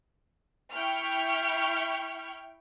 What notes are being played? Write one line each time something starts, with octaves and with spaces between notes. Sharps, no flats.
E4 G5 C#6 F6